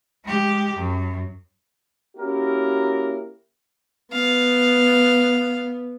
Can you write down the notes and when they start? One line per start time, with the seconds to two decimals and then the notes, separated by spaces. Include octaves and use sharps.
0.24 G#3 G4
0.76 F#2
2.17 A#3 C#4 E4 F#4 G4 A#4
4.13 B3 F5